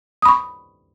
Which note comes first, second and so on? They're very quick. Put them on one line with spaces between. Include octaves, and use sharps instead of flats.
D#6 B5 C#6